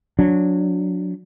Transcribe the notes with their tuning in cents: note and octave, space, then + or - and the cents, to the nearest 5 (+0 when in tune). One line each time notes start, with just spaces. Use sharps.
F#3 -20 D4 -15